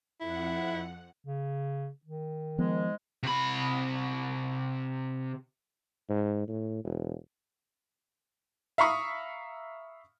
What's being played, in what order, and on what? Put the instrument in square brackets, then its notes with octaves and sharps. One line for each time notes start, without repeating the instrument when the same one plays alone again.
[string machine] F2 F#5 [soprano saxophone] E4
[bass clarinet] C#3
D#3
[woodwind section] G#2 G#3 [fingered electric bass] F3 B3
[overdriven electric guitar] C3 B5
[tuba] G#2
A2
E1
[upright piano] E5 F5 A#5 B5 C#6 D#6